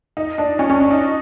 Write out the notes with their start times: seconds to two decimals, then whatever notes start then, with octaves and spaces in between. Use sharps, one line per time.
0.17 D#4
0.38 D4
0.59 C#4
0.70 C#4
0.80 D4
0.90 D#4